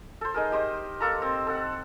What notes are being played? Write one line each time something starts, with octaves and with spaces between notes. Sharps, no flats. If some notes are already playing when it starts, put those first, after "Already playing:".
A4 C5
D#4 G#4 A#4
G4 C5 D#5
A#3 A4 A#5
C4
A4 F#5